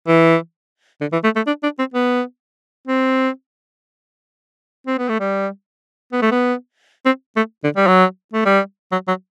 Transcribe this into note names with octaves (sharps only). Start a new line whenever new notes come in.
E3
D3
E3
A3
A3
D4
D4
C4
B3
C4
C4
B3
A3
G3
B3
A3
B3
C4
A3
D3
G3
F#3
A3
G3
F#3
F#3